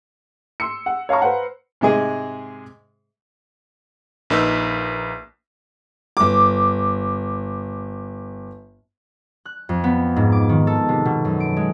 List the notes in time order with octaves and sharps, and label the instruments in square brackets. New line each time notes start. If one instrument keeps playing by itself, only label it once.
[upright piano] C6 E6 C#7
F#5
C#5 F5 A5 A#5 C#6
B4 C5 F5 F#5 A#5
[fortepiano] G#2 C3 G#3 G#4
[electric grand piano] A#1 A#3 D#4 B4 E6
[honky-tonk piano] G1 D6
[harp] F#6
F2
B3
G#2
D6
D#3
A4
C3
B2
F#2
D7
G#3